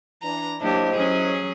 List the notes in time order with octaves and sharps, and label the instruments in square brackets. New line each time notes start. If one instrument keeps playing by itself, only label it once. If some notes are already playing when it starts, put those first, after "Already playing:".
[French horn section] E3 D4 [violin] A#5
[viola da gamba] F#3 A#3 G4 [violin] D4 [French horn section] E4 C5 D#5
[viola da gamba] F#3 C#4 [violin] G#4